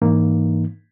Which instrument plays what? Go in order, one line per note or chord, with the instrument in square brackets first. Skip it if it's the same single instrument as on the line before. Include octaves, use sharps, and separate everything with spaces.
[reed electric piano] G#2 E3 A#3 D#4